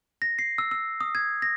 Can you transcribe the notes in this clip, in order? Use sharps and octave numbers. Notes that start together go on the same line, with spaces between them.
A#6
C7
E6
E6
D#6
G#6
A#6